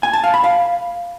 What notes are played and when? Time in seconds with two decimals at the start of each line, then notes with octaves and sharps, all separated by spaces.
0.03 G#5
0.13 A5
0.24 F5
0.34 B5
0.44 F5